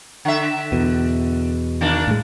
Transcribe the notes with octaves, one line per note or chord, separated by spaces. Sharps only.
D3 E5
E2 B2
D#3 A#3 D4
A2 G#3